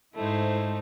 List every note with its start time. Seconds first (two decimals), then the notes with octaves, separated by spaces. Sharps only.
0.15 G#2 A3 D#4 E4 C5